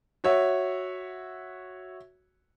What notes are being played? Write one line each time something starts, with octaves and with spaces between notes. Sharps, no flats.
F#4 C#5 E5